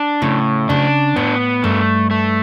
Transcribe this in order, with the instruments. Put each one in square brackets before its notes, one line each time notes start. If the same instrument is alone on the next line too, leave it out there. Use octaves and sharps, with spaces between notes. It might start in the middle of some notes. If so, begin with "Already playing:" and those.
Already playing: [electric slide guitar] D4
[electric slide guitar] A2 [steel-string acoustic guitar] C#3
[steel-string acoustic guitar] C#3 [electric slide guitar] D4
[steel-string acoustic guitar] A2 [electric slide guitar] B3
[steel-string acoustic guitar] G2 [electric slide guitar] A3
[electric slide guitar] A3